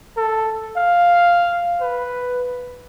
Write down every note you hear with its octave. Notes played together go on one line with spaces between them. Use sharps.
A4
F5
B4